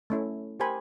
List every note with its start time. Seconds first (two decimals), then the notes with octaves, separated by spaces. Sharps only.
0.10 A3 C#4 E4
0.60 G4 A#4 C5 G#5 B5